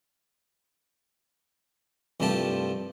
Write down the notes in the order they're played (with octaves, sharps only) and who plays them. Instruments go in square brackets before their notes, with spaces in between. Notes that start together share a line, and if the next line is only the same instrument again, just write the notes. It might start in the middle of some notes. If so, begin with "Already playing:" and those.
[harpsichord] C2 G2 F3 A3 G4 A5